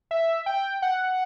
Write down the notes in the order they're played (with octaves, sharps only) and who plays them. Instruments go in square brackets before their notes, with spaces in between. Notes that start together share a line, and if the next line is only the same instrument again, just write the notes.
[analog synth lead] E5
G5
F#5